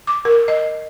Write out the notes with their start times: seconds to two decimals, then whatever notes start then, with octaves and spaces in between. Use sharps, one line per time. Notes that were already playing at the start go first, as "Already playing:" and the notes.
0.07 D6
0.25 A#4
0.48 D#5